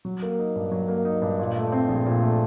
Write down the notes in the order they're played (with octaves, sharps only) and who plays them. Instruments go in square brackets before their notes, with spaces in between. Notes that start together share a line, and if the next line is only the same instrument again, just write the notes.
[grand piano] F#3
A#3
D#4
G2
F#3
A#3
D#4
G2
A#2
A3
C4
A#1
A#2
A3